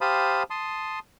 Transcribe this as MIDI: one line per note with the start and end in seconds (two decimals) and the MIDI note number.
0.01 0.43 67
0.01 0.43 72
0.01 0.43 77
0.01 0.43 81
0.01 0.43 83
0.01 0.43 87
0.50 0.99 81
0.50 0.99 84
0.50 0.99 87